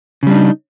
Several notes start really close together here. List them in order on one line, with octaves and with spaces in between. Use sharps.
C#3 G3 D4 D#4